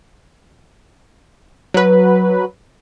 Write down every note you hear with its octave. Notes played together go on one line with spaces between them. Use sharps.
F#3 B4